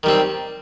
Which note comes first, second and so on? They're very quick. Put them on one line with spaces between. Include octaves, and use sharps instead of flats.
D#3 G3 C4